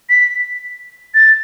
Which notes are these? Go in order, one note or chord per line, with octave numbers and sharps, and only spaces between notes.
B6
A6